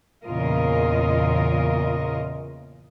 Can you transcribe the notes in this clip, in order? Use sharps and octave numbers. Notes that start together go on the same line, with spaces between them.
E2 A#2 C#3 F4 A#4 D#5